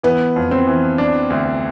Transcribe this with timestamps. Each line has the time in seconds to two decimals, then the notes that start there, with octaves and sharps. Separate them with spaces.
0.03 E3 B3
0.36 F2
0.51 C4
0.67 E3
0.98 D4
1.30 D2